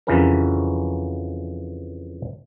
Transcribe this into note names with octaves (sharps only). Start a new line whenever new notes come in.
F2 C#3 E3 C#4 F#4 A#4